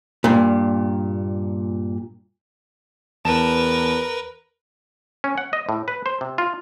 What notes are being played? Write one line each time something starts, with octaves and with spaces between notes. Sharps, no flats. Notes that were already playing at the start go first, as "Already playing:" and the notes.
G2 A#2
E2 A#4 B4 A5 E7
C#4
F#5
D#5
A2
B4
C5
C3
F4